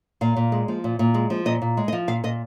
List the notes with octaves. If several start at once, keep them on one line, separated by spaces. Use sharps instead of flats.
A#2 F5
A#2
G#3
F3
A#2
A#2
G#3
F3
A#2 D#5
A#2
G#3
D#5
F3
A#2 F5
A#2 D#5